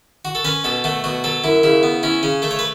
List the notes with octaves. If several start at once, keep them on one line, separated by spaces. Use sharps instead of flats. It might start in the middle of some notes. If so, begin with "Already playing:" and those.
F#4
A4
C#4 B4
B2 A4
A3 F#4
B2 F#4
F#3 A4
F#2 E4
C#3 E4
B3
C#4 E4
C#3 C#4
A3 E5
C#5
B4